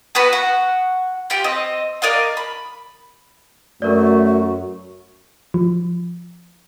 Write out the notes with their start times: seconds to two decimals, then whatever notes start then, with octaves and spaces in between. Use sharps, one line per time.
0.15 B3 F#4 B4 B5
0.33 F#4 F#5
1.30 F4 G4 G5
1.44 C4 D#5
2.02 A#4 D5 D#5 F5
2.37 B5
3.82 F#2 A3 F#4 A4 A#4 D5
5.54 F3